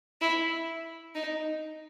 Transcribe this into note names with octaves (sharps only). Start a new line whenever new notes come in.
E4
D#4